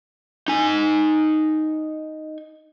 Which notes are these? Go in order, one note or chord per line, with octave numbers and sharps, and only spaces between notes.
D#4 G#5